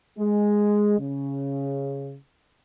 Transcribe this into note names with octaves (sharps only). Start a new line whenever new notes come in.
G#3
C#3